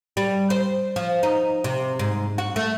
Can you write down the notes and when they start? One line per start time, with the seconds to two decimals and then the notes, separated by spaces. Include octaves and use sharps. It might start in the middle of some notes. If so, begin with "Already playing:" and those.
0.17 G3
0.50 C5
0.96 F3
1.23 D#4
1.64 C3
1.99 G#2
2.38 F#4
2.56 A3